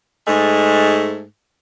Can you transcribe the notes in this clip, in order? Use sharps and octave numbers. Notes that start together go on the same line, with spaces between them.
G#2 G#3 A3